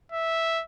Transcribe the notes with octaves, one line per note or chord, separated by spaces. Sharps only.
E5